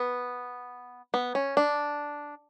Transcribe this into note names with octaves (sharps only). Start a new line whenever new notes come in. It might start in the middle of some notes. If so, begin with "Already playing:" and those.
Already playing: B3
B3
C#4
D4